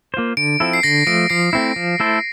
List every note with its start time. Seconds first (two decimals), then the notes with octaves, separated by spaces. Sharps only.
0.14 A#3 F4 C5
0.37 D3 D7
0.60 F3 C4 E4 A4
0.73 C7
0.83 D3 A#6
1.07 F3 A3 D7
1.30 F3 C7
1.53 A3 C4 E4
1.76 F3
2.00 A3 E4 A4 C5